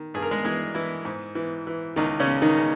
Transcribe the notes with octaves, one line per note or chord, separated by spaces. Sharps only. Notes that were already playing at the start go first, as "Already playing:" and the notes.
Already playing: D#3
G2 G#4
A#4
G#3 G#4
E3 G#3 G#4
E3 E4
G#2
E3
E3
C#2 D#3 D#4
C#3 C#4
C#2
D#3 D#4
C#3